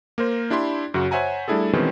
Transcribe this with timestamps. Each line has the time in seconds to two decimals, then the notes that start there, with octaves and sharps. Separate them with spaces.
0.18 A#3 A#4 C5
0.50 D4 E4 G4 B5 C6
0.94 F#2 C#3 F#4 F#5
1.11 C5 C#5 E5 F#5 G#5 A#5
1.48 G3 A3 D4 E4 G#4 A4
1.73 B2 D#3 E3 G#3 C4 C#4